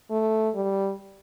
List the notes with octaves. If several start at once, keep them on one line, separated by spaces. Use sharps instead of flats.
A3
G3